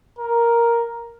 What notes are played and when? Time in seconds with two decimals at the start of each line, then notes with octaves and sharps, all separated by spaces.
0.19 A#4